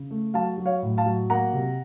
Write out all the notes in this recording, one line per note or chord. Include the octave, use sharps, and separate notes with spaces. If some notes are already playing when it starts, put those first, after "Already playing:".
Already playing: C#3
A3
F#3 F5 A5
F#3
C#5 F5
A2
F5 A5
F#3
A#3 F#5 A#5
C3